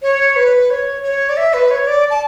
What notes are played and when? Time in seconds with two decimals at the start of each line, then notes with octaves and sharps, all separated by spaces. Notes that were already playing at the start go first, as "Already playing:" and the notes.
0.02 C#5
0.36 B4
0.70 C#5
1.03 C#5
1.29 D5
1.37 E5
1.54 B4
1.71 C#5
1.87 D5
2.10 A5